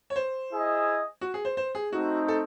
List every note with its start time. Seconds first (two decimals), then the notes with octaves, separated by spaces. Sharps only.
0.10 C#5
0.16 C5
0.51 E4 G#4 D#5
1.21 F#4
1.34 G#4
1.45 C5
1.57 C5
1.75 G#4
1.92 A3 C4 D#4 F#4
2.28 A4